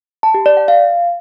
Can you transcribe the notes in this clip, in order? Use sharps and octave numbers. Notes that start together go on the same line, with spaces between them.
A5
G4
D5
F#5
F5